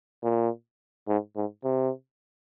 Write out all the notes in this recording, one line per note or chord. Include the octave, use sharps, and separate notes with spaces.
A#2
G#2
G#2
C3